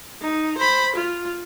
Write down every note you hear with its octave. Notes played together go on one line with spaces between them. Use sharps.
D#4
C5 B5
F4